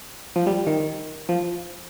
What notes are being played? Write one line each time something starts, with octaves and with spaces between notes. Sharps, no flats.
F3
G3
D#3
F3